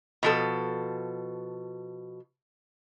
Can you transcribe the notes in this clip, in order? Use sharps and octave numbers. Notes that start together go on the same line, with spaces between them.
B2 F3 A4